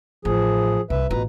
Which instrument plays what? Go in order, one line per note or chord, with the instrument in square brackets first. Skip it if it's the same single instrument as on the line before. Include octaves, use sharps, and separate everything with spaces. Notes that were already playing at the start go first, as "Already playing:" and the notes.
[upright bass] A1 [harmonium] F3 G#4
[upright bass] C2 [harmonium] B4 E5
[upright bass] A1 F4 [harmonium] B2 B4 A#5